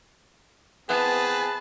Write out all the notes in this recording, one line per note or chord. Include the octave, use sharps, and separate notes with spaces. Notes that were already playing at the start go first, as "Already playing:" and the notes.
E3 B3 C4 G#4 B4 A5